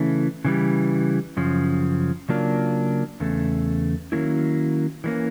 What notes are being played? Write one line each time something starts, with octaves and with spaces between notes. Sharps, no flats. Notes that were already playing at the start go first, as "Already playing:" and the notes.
Already playing: C#3 E3 A3 C#4
C#3 E3 G3
F#2 C#3 F3
C#3 F#3 A#3 D4 F4
E2 C#3 A3
D#3 F#3 A#3 C#4 E4
E3 G3 A#3 C#4